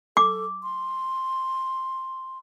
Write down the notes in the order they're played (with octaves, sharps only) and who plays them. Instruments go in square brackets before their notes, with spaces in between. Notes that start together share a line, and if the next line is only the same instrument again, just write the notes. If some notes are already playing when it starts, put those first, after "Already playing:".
[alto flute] A4 [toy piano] D6
[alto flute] C6